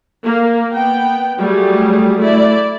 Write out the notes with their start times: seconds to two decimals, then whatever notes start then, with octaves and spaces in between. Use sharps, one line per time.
0.23 A#3
0.74 B3 G5
1.39 F#3 G3 A3 G#4
2.18 A3 E4 D5